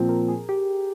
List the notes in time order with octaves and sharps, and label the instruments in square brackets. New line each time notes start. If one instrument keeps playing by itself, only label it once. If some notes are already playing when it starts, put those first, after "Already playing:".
Already playing: [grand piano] A#2 F3 C4
[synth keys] A#4
G#4
G4